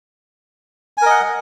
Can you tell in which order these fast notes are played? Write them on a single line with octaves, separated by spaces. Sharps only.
G#5 A#4 D#5 F#5